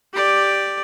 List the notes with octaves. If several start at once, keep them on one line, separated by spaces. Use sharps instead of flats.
G4 D5